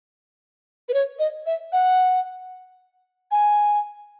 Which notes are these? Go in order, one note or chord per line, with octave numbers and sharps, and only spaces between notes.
B4
C#5
D#5
E5
F#5
G#5